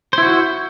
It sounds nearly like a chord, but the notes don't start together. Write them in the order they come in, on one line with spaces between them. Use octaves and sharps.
C5 E4 F#4